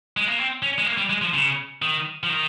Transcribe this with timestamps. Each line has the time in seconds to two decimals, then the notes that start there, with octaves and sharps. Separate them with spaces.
0.17 G#3
0.27 A#3
0.39 C4
0.62 C#4
0.78 G#3
0.86 A#3
0.97 G3
1.10 G#3
1.22 F3
1.34 C#3
1.82 D#3
2.23 F3
2.30 D#3